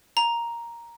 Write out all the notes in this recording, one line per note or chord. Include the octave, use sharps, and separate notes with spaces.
A#5